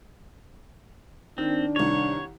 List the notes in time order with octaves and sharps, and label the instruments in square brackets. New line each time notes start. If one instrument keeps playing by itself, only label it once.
[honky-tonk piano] D#3 [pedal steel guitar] C4 [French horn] D4
[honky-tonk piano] C2 D#3 [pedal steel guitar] C#5